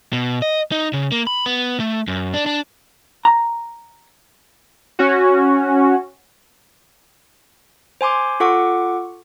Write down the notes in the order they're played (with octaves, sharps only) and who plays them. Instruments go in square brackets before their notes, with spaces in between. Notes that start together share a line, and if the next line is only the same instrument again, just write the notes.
[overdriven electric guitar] B2
D#5
D#4
C#3
A#3
B5
B3
A3
F#2
D4
D4
[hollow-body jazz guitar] A#5
[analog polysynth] C#4 F#4
[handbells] C5 G#5 C6 D6
F4 A4 F#5 C#6 D6